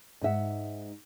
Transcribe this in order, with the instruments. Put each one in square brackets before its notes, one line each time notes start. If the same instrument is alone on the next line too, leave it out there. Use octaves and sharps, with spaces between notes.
[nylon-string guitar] G#2 D#4 E5 F#5